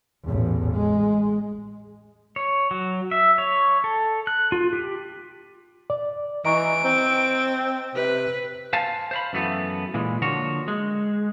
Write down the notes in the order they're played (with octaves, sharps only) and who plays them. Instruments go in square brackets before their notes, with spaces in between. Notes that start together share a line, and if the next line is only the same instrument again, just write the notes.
[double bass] A1 E2
G#3
[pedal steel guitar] C#5
F#3
E5
C#5
A4
F#6
F4
G4
[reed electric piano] D5
[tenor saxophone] E3 [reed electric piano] D#5 A#5 C#6 [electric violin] D7
[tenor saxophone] C4
[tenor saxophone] C3 [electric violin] B4
[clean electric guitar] C5 F5 G#5 A5
C5 F5 B5
F#2 E3 A3 B3
A#2 E3 G#3
D3 F3 A#3 F#4 C#5
G#3